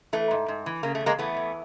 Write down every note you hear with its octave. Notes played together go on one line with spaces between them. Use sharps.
E3 A3
G#2
G#2
E3
C#3 A#3
A3
E2
G#3 A#3
E3 A3 B3
E2